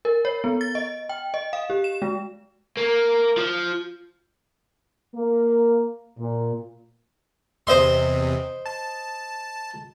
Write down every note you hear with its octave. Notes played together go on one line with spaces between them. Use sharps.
A#4
C#5
B3
A6
D#5
G5
D#5
F5
G4
E7
G#3
A#3
F3
A#3
A#2
E2 C3 C5 D#5 C6
A5